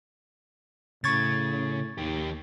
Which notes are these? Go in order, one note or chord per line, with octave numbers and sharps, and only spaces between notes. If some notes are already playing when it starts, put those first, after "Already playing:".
A2 C#3 C#6 G#6 A6
D#2 D#3 G4